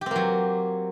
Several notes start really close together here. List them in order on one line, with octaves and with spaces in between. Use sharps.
G4 C4 A#3 F#3